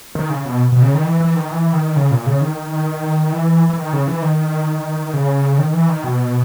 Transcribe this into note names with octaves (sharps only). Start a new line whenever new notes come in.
D#3
C#3
B2
B2
C#3
D#3
E3
E3
D#3
E3
D#3
C#3
A#2
C#3
D#3
E3
E3
D#3
C#3
E3
D#3
C#3
D#3
E3
D#3
B2